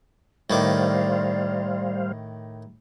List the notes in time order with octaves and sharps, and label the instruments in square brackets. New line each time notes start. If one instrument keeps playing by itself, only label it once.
[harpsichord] A2 D#3 D6 [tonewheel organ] G3 C5 F5 [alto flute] D5